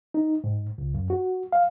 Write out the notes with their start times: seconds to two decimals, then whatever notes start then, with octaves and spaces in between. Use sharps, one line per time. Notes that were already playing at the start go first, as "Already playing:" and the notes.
0.14 D#4
0.44 G#2
0.78 C#2
0.94 F#2
1.10 F#4
1.52 F5